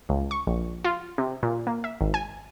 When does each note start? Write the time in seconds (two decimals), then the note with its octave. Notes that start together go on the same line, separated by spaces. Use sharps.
0.09 C#2
0.31 C#6
0.47 A#1
0.85 F4
1.18 C3
1.43 A#2
1.67 A#3
1.84 E5
2.01 G#1
2.14 G#5